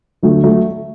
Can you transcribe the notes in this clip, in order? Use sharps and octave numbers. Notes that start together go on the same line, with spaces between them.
D2 F#3 A3
F#3 A3